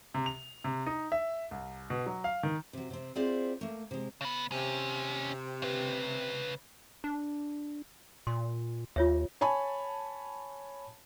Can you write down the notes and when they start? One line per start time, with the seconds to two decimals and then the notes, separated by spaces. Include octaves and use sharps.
0.14 C3
0.26 F7
0.64 C3
0.86 D#4
1.12 E5
1.51 C2
1.90 B2
2.06 F#3
2.24 F5
2.43 D#3
2.73 C3 F#3
2.90 C3 C4
3.15 C4 E4 F4 G#4 C5 D5
3.61 A3 A#3
3.91 C3 G#3
4.21 C#3 B3
4.52 D#2 C3 C#4
5.62 C#3 B4
7.04 D4
8.27 A#2 C6
8.96 D#2 F4 C#5 E5
9.41 C#5 G#5 A5 B5